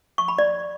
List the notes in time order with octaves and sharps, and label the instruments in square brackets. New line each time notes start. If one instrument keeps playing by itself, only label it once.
[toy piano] C#6
B5
D5